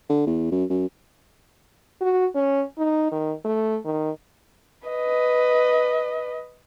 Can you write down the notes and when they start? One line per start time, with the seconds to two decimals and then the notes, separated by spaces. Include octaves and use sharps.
0.10 D3
0.27 E2
0.51 F#2
0.70 F#2
2.01 F#4
2.35 C#4
2.78 D#4
3.12 D#3
3.45 A3
3.85 D#3
4.89 B4 D#5